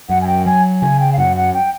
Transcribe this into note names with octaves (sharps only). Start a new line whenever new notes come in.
F#2 F#5
G#5
G5
F#3 G#5
C#3 G#5
G5
F5
F#2 F#5
F#5
G5